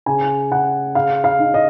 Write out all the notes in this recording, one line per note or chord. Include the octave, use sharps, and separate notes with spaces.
C#3 G#5
C#3 F#5
C#3 F5
F5
D#4
D#5